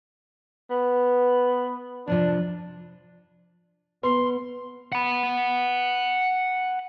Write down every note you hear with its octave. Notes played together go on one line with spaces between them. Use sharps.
B3
F2 C3 F3 D4
B3 B4 C6
F#5 B5